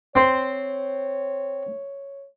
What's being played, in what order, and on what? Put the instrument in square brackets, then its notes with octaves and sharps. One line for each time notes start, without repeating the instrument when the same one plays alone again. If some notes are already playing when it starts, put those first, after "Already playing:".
[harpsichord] C4 C5 [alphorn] C#5